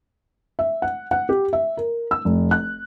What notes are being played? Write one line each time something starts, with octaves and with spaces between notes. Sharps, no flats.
E5
F#5
F#5
G4
E5
A#4
E6
F1
F#6